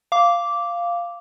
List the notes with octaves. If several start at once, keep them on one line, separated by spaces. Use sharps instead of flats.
F5 D6